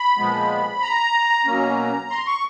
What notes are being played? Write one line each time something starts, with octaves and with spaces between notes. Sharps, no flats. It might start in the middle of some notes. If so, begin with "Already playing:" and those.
Already playing: B5
A#2 F3 G#3 B3
A#5
B2 F#3 A#3 C#4
C6
C#6